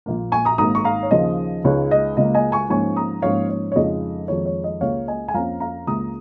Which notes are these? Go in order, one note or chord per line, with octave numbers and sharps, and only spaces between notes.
A#1 A#2 A#3
G#5 C#6
A#5 D#6
G#1 G#2 D#3 A#3 A#5 D#6
C#6
F5 A#5
C#5
D#2 C#3 F3 D#5
C#2 C#3 G#3 D#4 C#5
D#5
C#2 C#3 A#3 D#5
D#5 G#5
G#5 C#6
G#2 F3 A#3 C#4 G#5 C#6
A#5 D#6
G#2 F3 A#3 C#4 C#5 F5
C#5
C#5
F2 C#3 F3 G#3 D#4 D#5
F2 D#3 G#3 D#4 C#5
C#5
D#5
C#2 C#3 A#3 C#5 F5
D#5 G#5
G#5
F2 F3 A#3 C#4 F5 A#5
F5 A#5
C#2 C#3 A#3 A#5 D#6